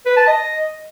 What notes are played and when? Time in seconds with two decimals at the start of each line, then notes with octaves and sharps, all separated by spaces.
0.06 B4
0.17 A5
0.27 D#5